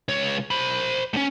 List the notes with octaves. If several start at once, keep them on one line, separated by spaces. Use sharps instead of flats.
C#2 C#5
C5 B5
A2 C#4